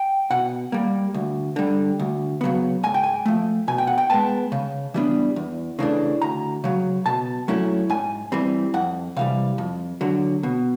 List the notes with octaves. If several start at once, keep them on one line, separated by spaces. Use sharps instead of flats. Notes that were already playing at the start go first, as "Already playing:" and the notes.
Already playing: G5
B2 F#5
G3 A#3
D2
D3 G3
D2
C#3 F#3 B3
G#2 G#5
G5
G#5
F3 A3
B2 G#5
G5
F#5
G5
G#3 B3 A5
C#3
E3 G3 B3 D4
E2
C#3 E3 A3 D4
D2 A#5
C#3 F#3
B2 A5
F#3 A3 C#4 E4
G#2 G#5
E3 G3 C4
F2 F#5
C3 E3 G3 F5
F2
D3 F#3
B2